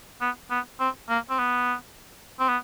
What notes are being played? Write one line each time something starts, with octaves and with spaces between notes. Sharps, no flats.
B3
B3
C4
A#3
C4
B3
C4
B3